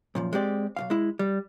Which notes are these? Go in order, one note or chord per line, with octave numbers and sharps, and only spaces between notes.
F#2 A#2 F3
G#3 C4 G4 D5
B1 F#2 F5
G#3 E4
G3